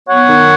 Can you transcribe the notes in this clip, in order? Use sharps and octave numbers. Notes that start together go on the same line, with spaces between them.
B3 C#5 F#5
D#3